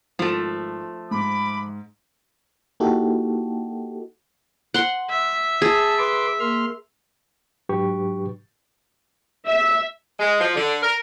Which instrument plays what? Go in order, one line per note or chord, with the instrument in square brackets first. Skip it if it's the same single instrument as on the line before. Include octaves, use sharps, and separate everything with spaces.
[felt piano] G#1 [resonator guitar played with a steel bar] F3 A3
[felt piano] G#2 [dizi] B5 [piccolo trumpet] D6
[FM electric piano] A#3 D#4 E4 F#4 G4 A4
[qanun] F#5 C6
[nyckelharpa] E5
[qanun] G#4 [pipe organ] A5
[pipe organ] B4 C6 D6
A#3 C6 F6
[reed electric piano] G#2 F#3 D4 G4 B4 C#6
[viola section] E5
[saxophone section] G#3
F3
D3
A#4